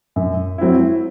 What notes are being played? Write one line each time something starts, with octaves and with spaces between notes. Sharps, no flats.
F#2
F#3 C4 E4